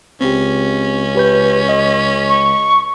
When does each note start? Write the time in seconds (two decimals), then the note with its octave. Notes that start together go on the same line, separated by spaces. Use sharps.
0.21 C#2 C4 C#4 G4
1.15 G4 B4 G6
1.69 D#5
2.28 C#6